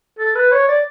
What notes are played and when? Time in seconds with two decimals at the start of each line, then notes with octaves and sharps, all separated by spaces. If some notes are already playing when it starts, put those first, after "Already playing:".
0.19 A4
0.35 B4
0.52 C#5
0.68 D5